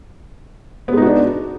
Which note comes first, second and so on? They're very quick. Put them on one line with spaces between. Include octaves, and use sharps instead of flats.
B3 G#3 D#4 F#4 D4